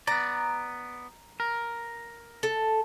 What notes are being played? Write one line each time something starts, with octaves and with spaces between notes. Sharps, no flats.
B3 D5 A#5
A#4
A4